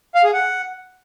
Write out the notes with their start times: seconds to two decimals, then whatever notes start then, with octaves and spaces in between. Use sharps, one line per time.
0.15 F5
0.24 G#4
0.33 F#5